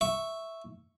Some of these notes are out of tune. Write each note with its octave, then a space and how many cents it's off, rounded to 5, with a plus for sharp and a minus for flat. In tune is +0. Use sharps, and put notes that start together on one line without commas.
E5 +0 C#6 +0